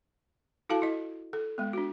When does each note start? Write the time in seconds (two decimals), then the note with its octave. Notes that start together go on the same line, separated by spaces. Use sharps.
0.69 E4 F#4 A4 F5 A5
0.82 E4 D#5
1.33 A4
1.58 G#3 B3
1.73 D4 F#4